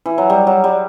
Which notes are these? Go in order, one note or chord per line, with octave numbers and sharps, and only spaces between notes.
E3
F#3
G3
F#3
G3